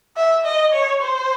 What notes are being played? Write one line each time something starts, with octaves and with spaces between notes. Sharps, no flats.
E5
D#5
C#5
C5